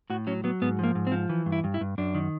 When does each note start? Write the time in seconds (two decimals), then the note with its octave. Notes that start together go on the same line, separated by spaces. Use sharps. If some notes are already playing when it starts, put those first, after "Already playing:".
0.10 A2 F#4
0.27 F#3 C#4
0.44 F#3 B3
0.62 G#2 B3
0.79 F3 A#3
0.95 G#2
1.07 C4
1.12 F3
1.29 E3
1.46 G2
1.52 E4
1.64 G2
1.74 E4
1.81 G2
1.98 F#2 D4
2.15 D#3